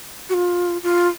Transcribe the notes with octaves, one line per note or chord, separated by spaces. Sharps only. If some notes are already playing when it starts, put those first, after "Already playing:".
F#4
F4
F4